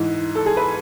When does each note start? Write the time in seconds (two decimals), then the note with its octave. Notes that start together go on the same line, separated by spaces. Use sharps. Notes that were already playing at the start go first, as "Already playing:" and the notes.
Already playing: G#2 E3
0.35 A4
0.46 G#4
0.57 B4